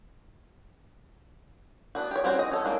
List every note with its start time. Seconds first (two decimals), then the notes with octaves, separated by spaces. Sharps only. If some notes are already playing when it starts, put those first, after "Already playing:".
1.95 B3 D4 F#4
2.11 G4 C#5
2.24 G3 C4 C#4 F#4 C5
2.39 D#5
2.51 A4 C#5
2.65 G#3 A#3 D4